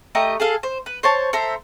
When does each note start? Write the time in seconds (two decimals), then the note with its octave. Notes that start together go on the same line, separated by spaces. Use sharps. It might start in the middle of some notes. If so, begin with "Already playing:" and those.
0.15 A3 G4 D#5 A#5
0.40 G#4 A4 F5
0.63 C5
0.86 B4
1.03 C5 C#5 A5
1.33 A4 C5 E5 A#5